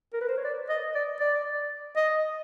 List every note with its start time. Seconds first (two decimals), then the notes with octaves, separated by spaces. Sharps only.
0.14 A#4
0.21 B4
0.28 C5
0.37 C#5
0.44 D5
0.69 D#5
0.95 D5
1.20 D5
1.97 D#5